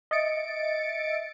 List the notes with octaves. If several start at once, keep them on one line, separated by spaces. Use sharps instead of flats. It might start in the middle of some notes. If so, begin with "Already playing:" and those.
D#5 E5 A6 C#7 D7